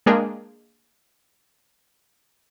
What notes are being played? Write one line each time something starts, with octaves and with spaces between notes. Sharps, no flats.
G#3 A#3 D4 G#4 A#4 G5